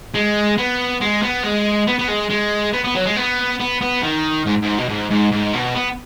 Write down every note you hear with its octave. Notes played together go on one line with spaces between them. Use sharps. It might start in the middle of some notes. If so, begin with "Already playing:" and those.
G#3
B3
G#3
B3
G#3
B3
B3
G#3
G#3
B3
B3
F#3
G#3
B3
B3
B3
D#3
G#2
G#2
B2
G#2
G#2
G#2
B2
B3